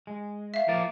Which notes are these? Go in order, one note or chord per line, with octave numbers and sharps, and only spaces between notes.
G#3
E5 F5
F3 A#3 D5